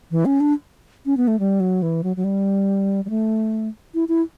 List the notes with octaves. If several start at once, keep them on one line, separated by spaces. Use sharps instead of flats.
E3
C#4
D4
C#4
B3
A3
G3
F#3
E3
F#3
F#3
G3
G3
A3
E4
E4